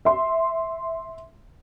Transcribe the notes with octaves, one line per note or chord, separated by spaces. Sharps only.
E5 C6